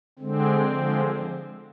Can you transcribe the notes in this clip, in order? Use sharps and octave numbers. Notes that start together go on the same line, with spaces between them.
D3 G#3 C4
D3 F3 G#3